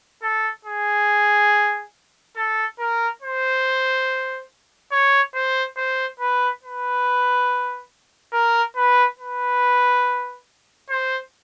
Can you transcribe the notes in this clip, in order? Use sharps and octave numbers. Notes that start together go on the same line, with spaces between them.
A4
G#4
A4
A#4
C5
C#5
C5
C5
B4
B4
A#4
B4
B4
C5